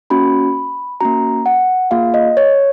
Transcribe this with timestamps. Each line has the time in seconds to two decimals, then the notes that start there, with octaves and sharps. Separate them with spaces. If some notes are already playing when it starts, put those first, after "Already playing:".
0.10 A#3 C#4 F#4 B5
1.01 A#3 C#4 F#4 A#5
1.46 F#5
1.91 A#3 F4 G#4 F5
2.14 D#5
2.37 C#5